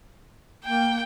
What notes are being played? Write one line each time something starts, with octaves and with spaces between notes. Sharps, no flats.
A#3 G5